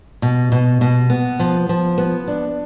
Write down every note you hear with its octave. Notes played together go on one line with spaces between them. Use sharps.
B2
B2
B2
B3
F3
F3
B3
D4